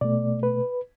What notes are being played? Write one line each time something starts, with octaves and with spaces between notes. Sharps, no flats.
B2 A3 D5
B4